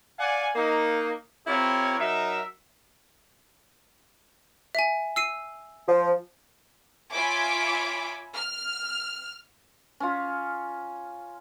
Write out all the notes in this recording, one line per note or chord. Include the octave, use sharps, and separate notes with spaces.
D5 F5 F#5 G#5
A#3 D#4
C4 E4 F4 G4 A#4 C#5
F#3 D#4 A#4 E5
E5 G#5
E6 C7 D#7
F3
F4 C#5 E5 G#5 B5 D6
F6
C#4 F4